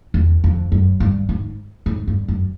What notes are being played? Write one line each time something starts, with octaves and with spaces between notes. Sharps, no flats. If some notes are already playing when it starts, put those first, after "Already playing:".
E2
F2
F#2
G2
G#2
G#2
G2
F#2